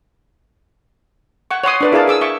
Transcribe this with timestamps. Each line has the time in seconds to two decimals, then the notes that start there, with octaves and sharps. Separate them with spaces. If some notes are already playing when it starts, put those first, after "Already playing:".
1.51 F#5 C#6
1.64 C#5 F#5 C6 D#6
1.81 D4 B4 D5
1.92 E4 G#4 A#4 D5 F5 A5
2.08 G#4 D6 E6
2.21 E5 C#6 D6